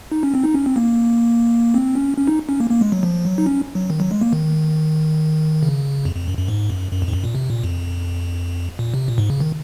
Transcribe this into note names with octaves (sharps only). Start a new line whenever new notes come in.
D#4
C#4
C4
D#4
C#4
C4
A#3
C4
C#4
C#4
D#4
C#4
A#3
A#3
G#3
F#3
F3
F#3
D#4
C#4
F#3
D#3
F#3
G#3
A#3
D#3
C#3
F2
F2
F#2
F#2
G#2
F#2
F#2
F2
G#2
F#2
A#2
C3
A#2
F2
A#2
C3
A#2
G#2
C#3
D#3